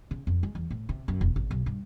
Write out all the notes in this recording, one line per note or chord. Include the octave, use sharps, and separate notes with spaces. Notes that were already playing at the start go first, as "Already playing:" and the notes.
C#3
F2
G#3
E2
A2
C3
F#2
E1
G#1
B1
G2